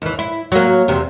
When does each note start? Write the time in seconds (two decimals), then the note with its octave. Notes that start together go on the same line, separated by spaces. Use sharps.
0.02 D#2 E3
0.19 E4
0.52 F#3 A#3
0.88 E2 C3